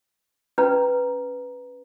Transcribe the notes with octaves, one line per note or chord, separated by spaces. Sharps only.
C#4 B4 A#5